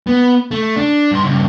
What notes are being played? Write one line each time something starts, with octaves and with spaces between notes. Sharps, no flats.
B3
A3
D4
G2 C6
G2 C#3